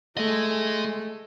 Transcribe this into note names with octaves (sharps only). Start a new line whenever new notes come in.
A3 G#4 D#5